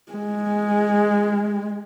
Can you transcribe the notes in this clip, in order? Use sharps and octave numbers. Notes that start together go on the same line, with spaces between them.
G#3